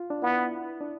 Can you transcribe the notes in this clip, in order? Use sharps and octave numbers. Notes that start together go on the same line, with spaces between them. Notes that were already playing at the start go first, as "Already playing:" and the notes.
Already playing: F4
D4
B3 E4
D4